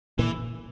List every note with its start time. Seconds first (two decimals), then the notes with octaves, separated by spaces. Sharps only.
0.18 A#2 D3 E3